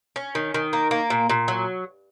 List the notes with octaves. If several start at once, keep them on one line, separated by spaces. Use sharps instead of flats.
C#4
D#3
D#3
A#3
A#3
A#2
A#2
F#3